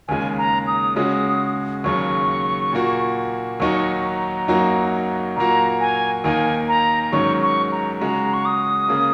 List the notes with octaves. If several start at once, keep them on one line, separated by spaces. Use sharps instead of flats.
D#2 C#3 G#3 G#5
A#5
D#6
C#3 G#3 C#4 F#4
D#2 C#3 F#3 C#6
A#2 A#3 F#4
D#2 D#3 F#3 D#4 F#4 C#6
A#5
F#2 F#3 A#3 D#4 F#4
A#2 F#3 A#3 F#4 A#5
G#5
D#2 D#3 A#3 D#4 G#5
A#5
G#2 D#3 F#3 C#4 C#6
C#6
A#5
C#3 G#3 F#4 A#5
C#6
D#6
C#3 A#3